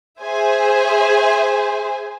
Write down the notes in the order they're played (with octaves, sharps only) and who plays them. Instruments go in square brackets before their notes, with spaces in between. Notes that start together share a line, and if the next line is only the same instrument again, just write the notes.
[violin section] G#4 C5 E5 G#5